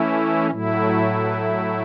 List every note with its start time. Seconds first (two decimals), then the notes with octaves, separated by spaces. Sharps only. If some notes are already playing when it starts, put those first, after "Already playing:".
Already playing: E3 A3 C#4 E4
0.50 A2 F#3 A3 E4
1.23 B4